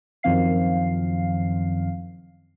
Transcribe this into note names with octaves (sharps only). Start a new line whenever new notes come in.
F#2 D#3 F3 C4 F5 C7